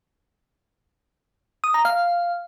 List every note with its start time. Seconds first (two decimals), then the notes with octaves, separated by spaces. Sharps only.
1.64 D#6
1.74 A#5
1.85 F5